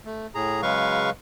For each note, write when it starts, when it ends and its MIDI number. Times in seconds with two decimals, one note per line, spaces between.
0.05 0.27 57
0.35 0.61 45
0.35 0.61 68
0.35 0.61 82
0.62 1.10 49
0.62 1.10 54
0.62 1.10 56
0.62 1.10 71
0.62 1.10 77
0.62 1.10 85